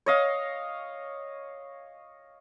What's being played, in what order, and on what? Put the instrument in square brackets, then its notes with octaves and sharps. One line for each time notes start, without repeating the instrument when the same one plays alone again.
[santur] C#5 D#5 F5